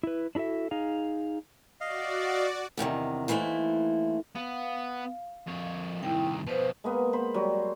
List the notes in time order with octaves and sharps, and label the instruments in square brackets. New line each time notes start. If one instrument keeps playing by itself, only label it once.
[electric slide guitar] E4 B4
D4 E4 F#4 A4 E5
D#4 G#4 F5
[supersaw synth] F#4 D5 [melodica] D#5 F5
[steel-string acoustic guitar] E2 G2 C3 D#3
D#2 E3 A3 E4 C5
[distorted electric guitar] B3 [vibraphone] F5
[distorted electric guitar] F2 C#5
[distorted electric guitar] C2 D#3 [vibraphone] E4 G5
[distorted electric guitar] B2 F3 [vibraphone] B4 C5
[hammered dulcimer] G#3 A#3 B3
C5 B5
F#3 G3